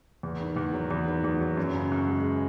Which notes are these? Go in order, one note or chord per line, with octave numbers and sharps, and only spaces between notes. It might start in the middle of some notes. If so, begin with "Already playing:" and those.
E2
D#3
E2
F#3
E2
D#3
E2
F#3
F#2
C#3
F#2
G#3